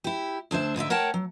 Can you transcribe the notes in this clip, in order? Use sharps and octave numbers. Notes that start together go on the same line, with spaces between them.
E4 G4
D2 D4 C5 E5
G#2 D3 D5 E5
A#4 C#5 F#5 G5 A5
F#3